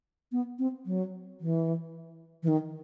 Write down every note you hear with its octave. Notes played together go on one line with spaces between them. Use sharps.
B3
C4
F#3
E3
E3
D#3